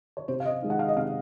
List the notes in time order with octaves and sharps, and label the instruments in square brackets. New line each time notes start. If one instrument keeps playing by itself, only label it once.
[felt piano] C#5
C3 C5
F5
D#5
D#3 G#3
F#5
F5
D#5
C3 F5